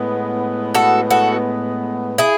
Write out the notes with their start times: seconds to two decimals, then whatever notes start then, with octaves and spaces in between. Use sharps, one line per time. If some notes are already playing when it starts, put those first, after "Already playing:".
Already playing: A2 G#3 B3
0.75 F#4 A4
1.10 F#4 A4
2.18 E4 G#4